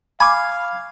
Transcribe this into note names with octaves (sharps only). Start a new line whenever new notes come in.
F5 G#5 B5 C#6 D6